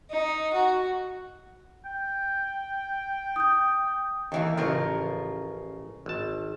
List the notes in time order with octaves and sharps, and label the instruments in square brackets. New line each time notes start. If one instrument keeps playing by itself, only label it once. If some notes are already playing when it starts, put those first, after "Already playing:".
[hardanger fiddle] D#4
F#4
[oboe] G5
[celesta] D#6 G6
[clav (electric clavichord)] D#2 [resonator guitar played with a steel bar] D#3 E3 A#3
[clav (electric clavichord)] A1 F3 [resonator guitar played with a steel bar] C#3 F4 A#4
[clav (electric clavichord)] G#1 A5